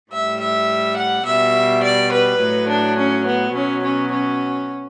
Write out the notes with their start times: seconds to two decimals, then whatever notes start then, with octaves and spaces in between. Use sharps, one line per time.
0.11 A2 G3 E5
0.40 E5
0.97 F#5
1.26 B2 G3 E5
1.83 D5
2.12 B4
2.41 A2 F#3
2.69 D4
2.98 C#4
3.26 B3
3.55 B2 F#3 C#4
3.84 C#4
4.12 C#4